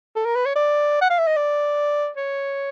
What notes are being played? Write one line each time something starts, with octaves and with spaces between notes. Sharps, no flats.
A4
A#4
B4
C#5
D5
F#5
F5
E5
D#5
D5
C#5